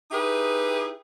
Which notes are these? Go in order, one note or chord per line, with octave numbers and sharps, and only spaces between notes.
D#4 E4 G4 G#4 B4